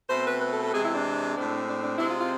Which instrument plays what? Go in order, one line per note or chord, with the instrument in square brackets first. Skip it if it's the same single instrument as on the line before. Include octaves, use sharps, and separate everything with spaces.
[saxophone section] B2 A3 C4 C5
B4
B4
A4
A4
C3 E3 G#3 C4 G#4
E4
D4
A2 G#3 C4
D4
D4
C3 G#3 C4 E4
F4
F4